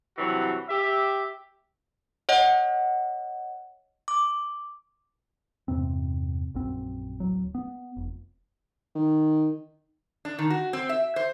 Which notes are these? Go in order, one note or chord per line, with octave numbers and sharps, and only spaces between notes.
G2 C3 E3 F#3 F#4
G4 E5
C#5 D#5 F#5
D6
E2 G2 C3 C4
A#1 F#2 C4
D1 F#3
B3
F1
D#3
D4
D#3
F#4
C4
E5
C5